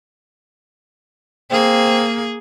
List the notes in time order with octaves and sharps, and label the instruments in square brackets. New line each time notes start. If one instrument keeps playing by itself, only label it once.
[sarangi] A#3 [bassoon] C4 [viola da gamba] G#4